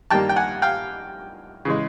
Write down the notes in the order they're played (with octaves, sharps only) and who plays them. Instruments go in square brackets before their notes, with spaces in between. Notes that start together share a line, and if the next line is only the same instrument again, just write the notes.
[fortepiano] G2 D#3 G3 A#3 G5 A5
G5
F#5 G#5
F5 G5
C#3 E3 G#3